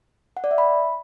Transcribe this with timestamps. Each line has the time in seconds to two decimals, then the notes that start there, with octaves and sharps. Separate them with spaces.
0.37 F#5
0.44 D5
0.51 E5
0.58 B5